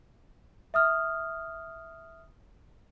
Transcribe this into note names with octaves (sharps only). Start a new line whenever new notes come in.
E5 D#6 F6